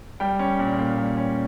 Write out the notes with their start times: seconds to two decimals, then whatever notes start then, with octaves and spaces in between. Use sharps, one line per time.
0.20 G3 G5
0.39 C#4
0.59 A#2
0.78 A#3
0.98 G3
1.17 C#4